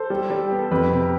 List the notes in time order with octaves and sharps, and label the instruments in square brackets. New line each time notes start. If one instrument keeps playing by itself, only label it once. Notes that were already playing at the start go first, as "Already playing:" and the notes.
Already playing: [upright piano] A4 C5
[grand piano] G3
G3
[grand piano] B3 [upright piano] G4
[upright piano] A4
[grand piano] F2 [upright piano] G4 B4
[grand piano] C3
[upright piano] G4